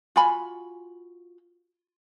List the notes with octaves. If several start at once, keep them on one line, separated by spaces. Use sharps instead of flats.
F4 F#4 G#5 B5